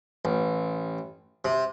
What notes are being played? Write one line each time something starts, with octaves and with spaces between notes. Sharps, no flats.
A1
C3